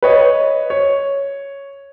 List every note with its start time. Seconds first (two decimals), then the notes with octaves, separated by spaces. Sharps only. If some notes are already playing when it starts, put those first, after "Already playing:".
0.02 B4 C#5 D#5
0.70 C#5